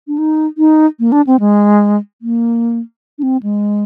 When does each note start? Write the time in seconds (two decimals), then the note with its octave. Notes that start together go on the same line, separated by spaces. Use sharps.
0.08 D4
0.18 D#4
0.58 D#4
1.00 A#3
1.12 D4
1.27 C4
1.40 G#3
2.22 A#3
3.18 D4
3.23 C4
3.43 G#3